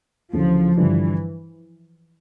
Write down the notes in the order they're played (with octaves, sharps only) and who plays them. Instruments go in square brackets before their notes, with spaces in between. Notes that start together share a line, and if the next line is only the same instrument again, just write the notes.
[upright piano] D2 C#3 E3 A3 C#4 [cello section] F3
[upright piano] G2 D3 G3 D4 F4 [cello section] E3